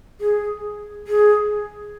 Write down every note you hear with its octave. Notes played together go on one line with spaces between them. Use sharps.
G#4
G#4